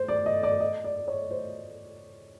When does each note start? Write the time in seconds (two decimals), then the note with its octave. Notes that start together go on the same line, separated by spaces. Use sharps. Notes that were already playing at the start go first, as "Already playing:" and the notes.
Already playing: C5
0.08 D5
0.26 D#5
0.43 D5
0.60 D#5
0.84 D5
0.96 D5
1.08 C#5
1.31 C5